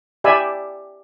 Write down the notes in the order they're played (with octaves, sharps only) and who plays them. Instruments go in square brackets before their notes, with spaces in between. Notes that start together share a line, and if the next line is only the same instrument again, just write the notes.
[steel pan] G4 D5 E5 G#5 B5